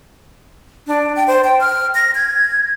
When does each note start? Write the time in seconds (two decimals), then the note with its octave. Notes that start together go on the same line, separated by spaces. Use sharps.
0.87 D4
1.16 G5
1.27 C5
1.44 G5
1.61 F6
1.95 A#6
2.15 G#6